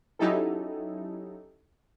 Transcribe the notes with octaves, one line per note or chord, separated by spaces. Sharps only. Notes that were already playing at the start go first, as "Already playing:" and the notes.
F#3 C#4 D#4 E4 G4 A4